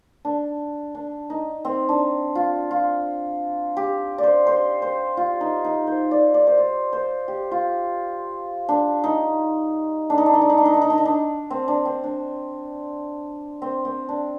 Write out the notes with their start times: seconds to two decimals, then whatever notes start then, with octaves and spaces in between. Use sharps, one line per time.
0.25 D4
0.95 D4
1.30 D#4
1.65 C4
1.89 D4
2.35 F4
2.71 F4
3.77 G4
4.18 C5 D5
4.47 C5
4.82 C5
5.17 F4
5.41 D#4
5.64 D#4
5.87 C5
6.11 D5
6.34 D5
6.47 C5
6.58 D5
6.93 C5
7.28 G4
7.51 F4
8.69 D4
9.04 D#4
10.10 D4
10.18 D#4
10.26 D4
10.34 D#4
10.41 D4
10.50 D#4
10.58 D4
10.65 D#4
10.74 D4
10.82 D#4
10.90 D4
10.98 D#4
11.05 D4
11.50 C4
11.68 D4
11.85 C4
12.04 D4
13.62 C4
13.85 C4
14.09 D4